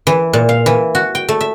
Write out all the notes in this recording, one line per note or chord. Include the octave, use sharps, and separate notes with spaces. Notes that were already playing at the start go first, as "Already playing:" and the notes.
E3
A#2
F5
E3
F#4
G5
A3
E5